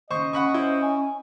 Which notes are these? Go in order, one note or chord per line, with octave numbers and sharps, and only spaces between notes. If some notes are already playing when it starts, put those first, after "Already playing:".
D#2 C#3 C5 D#5 C#6
C#4 F#5 B5 C#6
E4 C5 F#5 C6
G#5